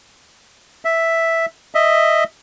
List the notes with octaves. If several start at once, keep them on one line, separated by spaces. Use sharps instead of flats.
E5
D#5 E5